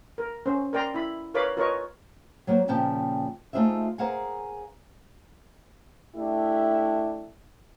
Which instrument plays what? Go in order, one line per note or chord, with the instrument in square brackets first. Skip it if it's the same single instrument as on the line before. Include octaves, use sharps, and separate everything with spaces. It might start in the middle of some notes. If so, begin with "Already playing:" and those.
[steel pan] A#4
C#4 C5
A#4 D5 G5 A#5 C6
E4 B5
A#4 B4 C#5 F5 B5 D6
F4 A#4 B4 C#5 D#5 C#6
[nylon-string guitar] F#3 A#3 A#4 C5
D#2 A#2 C#3 F3 G5 A5
A3 D#4 F4 G#4 C5 E5
G#4 A#4 C5 F5 F#5 G#5
[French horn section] A3 D4 E4 G4